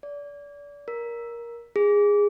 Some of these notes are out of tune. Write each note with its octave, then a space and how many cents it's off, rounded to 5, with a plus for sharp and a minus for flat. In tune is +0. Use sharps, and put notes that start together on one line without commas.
D5 -30
A#4 +10
G#4 -15